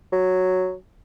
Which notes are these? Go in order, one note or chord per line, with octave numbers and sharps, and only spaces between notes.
F#3